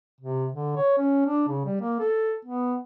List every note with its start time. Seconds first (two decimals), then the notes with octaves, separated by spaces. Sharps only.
0.21 C3
0.52 D3
0.77 C#5
0.98 C#4
1.26 D4
1.48 C#3
1.65 G3
1.81 A#3
1.99 A4
2.45 B3